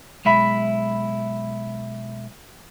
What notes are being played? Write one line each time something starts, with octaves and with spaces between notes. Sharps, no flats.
B1 G#3 E4 E5 B5